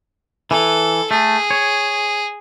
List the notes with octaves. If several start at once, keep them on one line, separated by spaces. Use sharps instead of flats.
E3 A4
A3 G#4
C#5